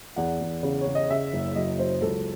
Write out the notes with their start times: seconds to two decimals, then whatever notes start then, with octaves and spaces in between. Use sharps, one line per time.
0.16 E2 F#5
0.41 E2
0.63 C#3
0.81 C#5
0.87 C#3
0.95 D#5
1.10 C#3 E5
1.33 F#1
1.55 F#3 D#5
1.79 F#3 C5
2.02 C#2 A4